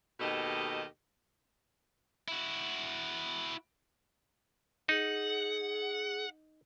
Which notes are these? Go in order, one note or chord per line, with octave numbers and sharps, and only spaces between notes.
D#2 B2 D#3 G4 A4 D#5
E4 F#4
D#4 G#4 F#5